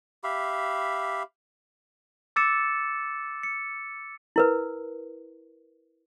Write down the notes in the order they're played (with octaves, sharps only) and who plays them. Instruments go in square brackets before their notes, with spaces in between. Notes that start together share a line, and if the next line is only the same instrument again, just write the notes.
[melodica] G4 E5 F5 B5
[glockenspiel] D6 E6 A6 C#7 E7
C#7
[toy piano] E4 A#4 B4